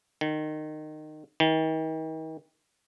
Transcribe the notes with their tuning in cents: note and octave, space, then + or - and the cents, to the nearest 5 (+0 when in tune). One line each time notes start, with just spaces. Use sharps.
D#3 -20
D#3 +40